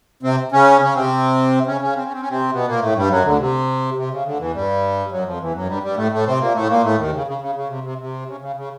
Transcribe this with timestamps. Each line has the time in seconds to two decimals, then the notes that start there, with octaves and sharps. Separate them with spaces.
0.23 C3 C4
0.52 C#3 C#4
0.81 C#3 C#4
0.94 C3 C4
1.66 C#3 C#4
1.81 C#3 C#4
1.96 C4
2.04 C#4
2.13 C4
2.20 C#4
2.29 C3 C4
2.52 B2 B3
2.67 A#2 A#3
2.81 A2 A3
2.96 G2 G3
3.10 F#2 F#3
3.25 D2 D3
3.38 C3
3.96 C3
4.11 C#3
4.25 D2 D3
4.39 E2 E3
4.54 G2 G3
5.11 F#2 F#3
5.25 F2 F3
5.39 E2 E3
5.55 F#2 F#3
5.68 G2 G3
5.83 G2 G3
5.97 A2 A3
6.12 A2 A3
6.26 C3 C4
6.40 A#2 A#3
6.55 A2 A3
6.69 A#2 A#3
6.83 A2 A3
6.98 D#2 D#3
7.12 C#3
7.27 C#3
7.41 C#3
7.55 C#3
7.69 C3
7.84 C3
7.98 C3
8.27 C#3
8.40 C#3
8.56 C#3